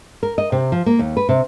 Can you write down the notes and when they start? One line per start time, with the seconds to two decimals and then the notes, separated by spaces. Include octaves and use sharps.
0.23 A#4
0.38 D#5
0.52 C3
0.72 F3
0.86 A#3
0.99 D#2
1.17 B4
1.29 C3